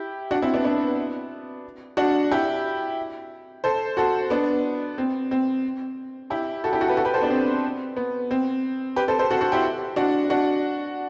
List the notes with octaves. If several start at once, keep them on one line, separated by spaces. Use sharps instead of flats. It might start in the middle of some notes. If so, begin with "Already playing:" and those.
Already playing: E4 G4
D4 F#4
C4 E4
B3 D4
B3 D4
D4 F#4
E4 G4
A4 C5
F#4 A4
B3 D4
C4
C4
E4 G4
F#4 A4
E4 G4
F#4 A4
G4 B4
F#4 A4
G4 B4
A4 C5
B3 D4
C4
B3
C4
G4 B4
A4 C5
A4 C5
F#4 A4
F#4 A4
E4 G4
D4 F#4
D4 F#4